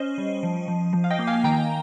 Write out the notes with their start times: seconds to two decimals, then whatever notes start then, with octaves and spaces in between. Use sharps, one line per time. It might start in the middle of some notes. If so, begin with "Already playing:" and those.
Already playing: C#4 C5 D#5
0.18 G3
0.43 F3
0.68 F3
0.93 F3
1.04 F5
1.10 D#5 G5
1.19 A#3
1.27 F5 G#5
1.44 D#3 G5 A#5